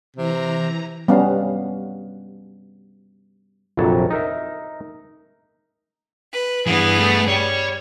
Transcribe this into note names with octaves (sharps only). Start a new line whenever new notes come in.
C3 E3 A#5
G3 B3 C#4 F5 A5
A#1 F2 C3 F#3 C#5 A5
D#4 A#4 E5
B4
G2 E3 B3 G#4
A3
G3 C#5